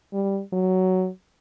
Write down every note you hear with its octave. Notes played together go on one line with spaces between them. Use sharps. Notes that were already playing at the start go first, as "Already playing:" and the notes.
G3
F#3